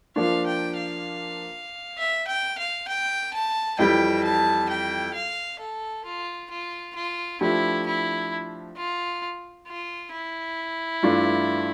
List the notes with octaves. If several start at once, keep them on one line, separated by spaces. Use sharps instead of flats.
F3 A#3 D4 F5
G5
F5
E5
G5
F5
G5
A5
F2 E3 G3 G5
A5
G5
F5
A4
F4
F4
F4
F3 A3 D4 E4 G4
E4
F4
F4
E4
G2 E3 A3 D4 F4